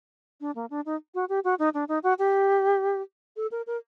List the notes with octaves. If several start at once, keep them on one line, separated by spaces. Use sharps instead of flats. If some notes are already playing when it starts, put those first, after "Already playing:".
D4
A#3
D4
D#4
F#4
G4
F#4
D#4
D4
D#4
F#4
G4
A4
A#4
A#4